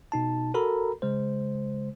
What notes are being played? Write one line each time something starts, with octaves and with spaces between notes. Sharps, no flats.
B2 D#4 A5
F#4 A4 A#4 A#5 B5
C#3 G#3 C5